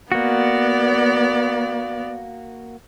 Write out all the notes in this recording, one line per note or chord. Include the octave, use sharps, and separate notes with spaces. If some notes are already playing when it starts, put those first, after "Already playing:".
A#3 B3 F#4 D5